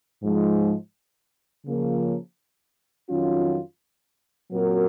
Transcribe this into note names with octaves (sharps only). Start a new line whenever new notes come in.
G#2 F3 G#3
C#3 F3 A#3
F2 D#3 F#3 C#4 F4
A#2 F#3 C4 F#4 A#4